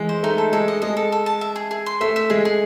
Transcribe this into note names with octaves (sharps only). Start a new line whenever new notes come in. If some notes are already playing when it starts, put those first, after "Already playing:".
Already playing: E3 G#3
C5
A3 D#4
A4
G#3 A4
D#5
G#3 D#5
A4
A4
A5
E5
G#4
G#4
C6
A3 E5
E5
G#3 G#4
G#4